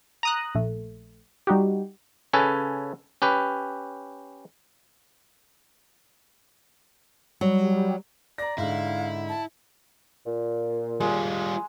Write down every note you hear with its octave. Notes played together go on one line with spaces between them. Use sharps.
A#5 D#6 F#6
A#1 A3
G3 D#4 F#4 G4
C#3 C#4 A4 B4 G#5
C#4 G4 B4
F#3 G3
D5 A#5 A#6
G#2 D3 E4 F5
A5
A#2
G3 G#3 F4